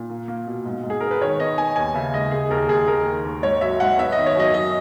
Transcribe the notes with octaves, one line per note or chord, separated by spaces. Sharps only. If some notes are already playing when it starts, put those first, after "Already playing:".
Already playing: A#2
A#3
A#3
B2
G#2
G#2
G#4
B3 A#4
B4
D#3 C#5
B3 D#5
B3 G#5
D#2 G#5
C#3 E5
G#3 D#5
D#2 G#4
D#2 A#4
D#2 G#4
D#2 A#4
D#3
D#2
G#2 C#5
F#3 E5
G#2 F#5
B3 E5
D#5
D#3
C#5
F#2 D#5
F#3 D#5